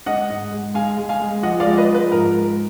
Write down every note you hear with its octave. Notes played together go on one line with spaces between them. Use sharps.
G#3 D#5 F#5
G#2
G#3
G#3 F5 G#5
G#3
F5 G#5
G#3
F3 D#5 F#5
D5 F5
G#3
B4 D#5
F3
B4
G#2 A#4
G#3